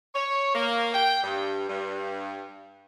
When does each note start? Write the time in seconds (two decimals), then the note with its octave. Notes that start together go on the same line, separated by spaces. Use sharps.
0.15 C#5
0.55 A#3
0.94 G5
1.23 G2
1.69 G2